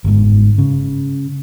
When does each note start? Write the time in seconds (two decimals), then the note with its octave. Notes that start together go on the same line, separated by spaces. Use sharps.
0.04 G1 G#2
0.58 C#3